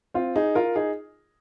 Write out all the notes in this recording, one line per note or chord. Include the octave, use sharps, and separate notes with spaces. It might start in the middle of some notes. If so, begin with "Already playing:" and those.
C4 F4
D#4 G#4
F4 A#4
D#4 G#4